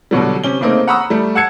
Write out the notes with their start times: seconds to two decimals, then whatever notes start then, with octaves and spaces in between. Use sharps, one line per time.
0.11 B2 D3 F#3 G3
0.44 C3 C#4 G7
0.61 C#3 A3 A#3 C4 D#4
0.88 F#5 A#5 B5 C#6 D#6 E6
1.10 G3 A3
1.35 F#5 A5 E6 G#6 C#7